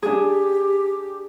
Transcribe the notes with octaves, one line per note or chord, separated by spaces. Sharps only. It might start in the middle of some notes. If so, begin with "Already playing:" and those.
D4 G4 G#4